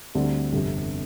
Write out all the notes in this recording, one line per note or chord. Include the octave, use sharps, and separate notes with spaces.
D2 D3 G3 C4
G1 F2 C3